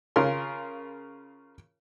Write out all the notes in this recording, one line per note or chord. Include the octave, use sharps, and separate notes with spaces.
C#3 F4 A#4 C6